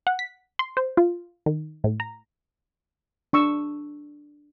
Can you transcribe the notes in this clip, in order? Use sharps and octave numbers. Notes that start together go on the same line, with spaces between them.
F#5
B6
C6
C5
F4
D#3
A2
A#5
D4 C#6 E6